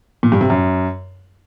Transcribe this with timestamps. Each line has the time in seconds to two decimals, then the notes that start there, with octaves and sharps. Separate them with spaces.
0.23 A#2
0.32 G2
0.41 C3
0.50 F#2